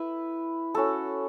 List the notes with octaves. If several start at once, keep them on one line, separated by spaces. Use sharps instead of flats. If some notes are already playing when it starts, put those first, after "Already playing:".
Already playing: E4 B4 E5
C#4 F#4 A4